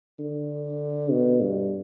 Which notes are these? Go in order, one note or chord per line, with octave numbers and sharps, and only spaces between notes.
D3
B2
G2